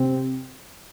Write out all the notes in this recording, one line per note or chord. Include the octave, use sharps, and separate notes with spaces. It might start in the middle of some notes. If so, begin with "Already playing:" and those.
Already playing: C3 C4